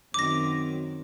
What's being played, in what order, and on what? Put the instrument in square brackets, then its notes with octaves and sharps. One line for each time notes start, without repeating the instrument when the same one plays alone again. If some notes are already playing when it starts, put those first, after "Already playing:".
[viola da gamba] F#2 D#3 C4 [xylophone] D6 A#6